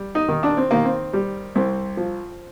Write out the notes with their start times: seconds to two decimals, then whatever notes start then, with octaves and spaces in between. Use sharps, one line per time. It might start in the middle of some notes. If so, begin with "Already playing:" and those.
Already playing: G3
0.15 D#4
0.29 D#3
0.43 D4
0.57 C4
0.71 D#3 A#3
0.85 C4
1.13 G3
1.55 C2 C4
1.97 F3